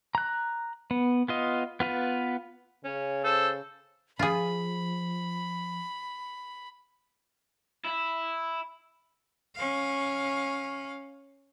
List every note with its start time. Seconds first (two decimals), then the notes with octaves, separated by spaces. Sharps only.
0.15 A#5 F#6
0.91 B3
1.28 B3 F4 D#5
1.80 B3 F4 B4
2.85 C#3 C#4
3.24 A4 C5
4.19 F3 F4 G#4 B5
7.84 E4 E5
9.55 C#4 F5